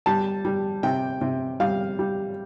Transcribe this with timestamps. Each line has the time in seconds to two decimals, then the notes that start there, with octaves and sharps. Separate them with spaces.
0.06 G3 A5
0.45 G3
0.83 C3 G5
1.21 C3
1.60 G3 F5
1.99 G3